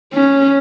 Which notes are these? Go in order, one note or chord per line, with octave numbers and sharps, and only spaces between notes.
C#4